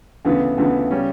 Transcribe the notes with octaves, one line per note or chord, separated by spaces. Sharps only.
D2 C#3 E3 B3
D2 C#3 E3 B3
C#3 G3 C#4